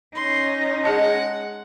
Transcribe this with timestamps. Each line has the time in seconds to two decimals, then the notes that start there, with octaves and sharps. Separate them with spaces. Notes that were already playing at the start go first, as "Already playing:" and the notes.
0.15 C#4 D#4 C6
0.84 G#3 G#4 D#5 F#5 A5